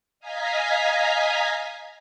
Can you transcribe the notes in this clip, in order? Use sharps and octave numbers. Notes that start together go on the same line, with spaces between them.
D#5 F5 G#5 A#5 G#6 B6